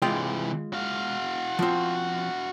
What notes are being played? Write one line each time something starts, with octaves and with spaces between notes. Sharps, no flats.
C3 E3 G#3 F4 G5
F#4 F5
F3 C4